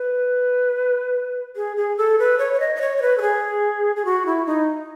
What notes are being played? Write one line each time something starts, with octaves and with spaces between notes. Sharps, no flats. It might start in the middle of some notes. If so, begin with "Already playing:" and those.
Already playing: B4
G#4
G#4
A4
B4
C#5
C#5
D#5
D#5
C#5
C#5
B4
A4
G#4
G#4
F#4
E4
D#4